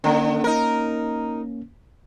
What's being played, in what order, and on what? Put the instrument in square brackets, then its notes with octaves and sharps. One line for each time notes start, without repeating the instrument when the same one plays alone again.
[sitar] D3 [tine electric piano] A#3 C#4
[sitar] D#4 A#4